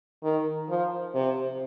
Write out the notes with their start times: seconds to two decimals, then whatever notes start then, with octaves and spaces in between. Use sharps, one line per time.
0.24 D#3
0.69 F3
1.15 C3